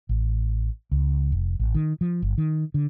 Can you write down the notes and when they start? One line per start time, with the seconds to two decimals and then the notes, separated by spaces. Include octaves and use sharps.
0.09 A1
0.92 C#2
1.32 F1
1.60 A1
1.75 D#3
2.01 F3
2.22 G1
2.38 D#3
2.74 D3